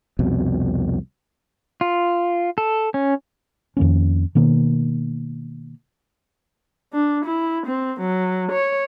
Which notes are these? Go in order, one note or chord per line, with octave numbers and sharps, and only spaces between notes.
C2 F2 B2
F4
A4
C#4
F2 D#3 A#3 C#4
B2 D#3 A#3
D4
E4
C4
F#3
C#5